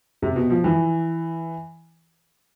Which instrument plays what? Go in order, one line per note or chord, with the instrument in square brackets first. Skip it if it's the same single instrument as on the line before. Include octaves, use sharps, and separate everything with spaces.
[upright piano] C3
B2
F3
E3